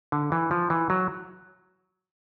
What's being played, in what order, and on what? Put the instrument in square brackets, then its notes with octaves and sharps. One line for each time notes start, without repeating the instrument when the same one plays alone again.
[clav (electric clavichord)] D3
E3
F3
E3
F#3